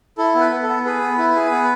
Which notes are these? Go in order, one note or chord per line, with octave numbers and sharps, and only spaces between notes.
E4 A4
B3
B4
B3
A4
B3
G#4 B4
B3
E4
G#4
B3